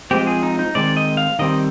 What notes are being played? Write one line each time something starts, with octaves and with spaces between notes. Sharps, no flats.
F3 G#3 C4 G4
G#4
D#4
D#4
D#3 G#3 C4 D5
D#5
F5
D#3 G3 C4 D#5